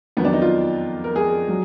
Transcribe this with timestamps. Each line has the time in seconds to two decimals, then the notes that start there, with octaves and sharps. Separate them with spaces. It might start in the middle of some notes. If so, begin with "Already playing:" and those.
0.17 F2 D#3 F#3 B3
0.25 D4
0.33 D#4
0.42 F4
1.04 A#4
1.16 G#4
1.48 F#3